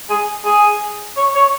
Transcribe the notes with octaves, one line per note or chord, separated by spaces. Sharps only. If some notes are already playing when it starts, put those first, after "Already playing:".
G#4
G#4
C#5
C#5